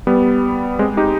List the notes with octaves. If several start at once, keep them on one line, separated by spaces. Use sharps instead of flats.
G3 B3
G#3 C4
D#4 G4